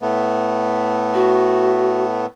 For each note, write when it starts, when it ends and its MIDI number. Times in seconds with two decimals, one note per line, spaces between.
0.02 2.26 45
0.02 2.26 57
0.02 2.26 59
1.14 2.04 66